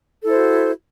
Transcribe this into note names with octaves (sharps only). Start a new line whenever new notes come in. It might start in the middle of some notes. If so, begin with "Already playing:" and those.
E4 F#4 A4 C5